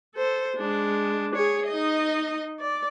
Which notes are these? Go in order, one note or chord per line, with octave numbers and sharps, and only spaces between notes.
A4 C5
G#3 D4
G#4 C#5
D#4 D#5
D5